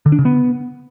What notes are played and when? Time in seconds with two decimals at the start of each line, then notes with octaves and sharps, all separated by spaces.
0.06 D3
0.12 D4
0.19 C#3
0.25 B3